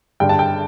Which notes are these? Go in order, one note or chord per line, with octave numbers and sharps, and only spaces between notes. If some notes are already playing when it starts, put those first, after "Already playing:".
G2 D3 G5
A5
G5